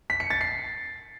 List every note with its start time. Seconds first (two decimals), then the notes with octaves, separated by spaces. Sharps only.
0.10 B6
0.20 C#7
0.30 A6
0.41 C7